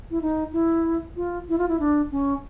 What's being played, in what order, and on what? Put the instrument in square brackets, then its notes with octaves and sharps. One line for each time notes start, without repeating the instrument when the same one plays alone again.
[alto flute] E4
D#4
E4
F4
E4
F4
E4
D4
C#4